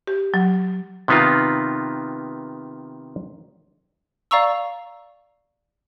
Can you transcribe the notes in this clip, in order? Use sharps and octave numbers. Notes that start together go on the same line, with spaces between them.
G4
F#3
C3 D#3 B3 D#4 F4
D5 F5 A#5 C#6 E6